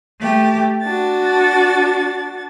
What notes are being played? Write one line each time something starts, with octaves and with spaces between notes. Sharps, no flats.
A3 G4
D4 F#4 A6